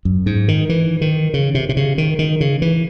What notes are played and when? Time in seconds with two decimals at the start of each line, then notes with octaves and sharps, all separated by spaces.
0.05 F#2
0.26 G#2
0.48 D#3
0.69 E3
1.01 D#3
1.34 C#3
1.55 C3
1.69 C3
1.77 C#3
1.98 D#3
2.19 D#3
2.41 C#3
2.62 E3